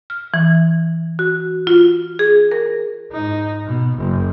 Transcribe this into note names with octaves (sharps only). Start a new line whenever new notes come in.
F6
E3
F#4
F4
G#4
A#4
G#2 D#4
B2
F#1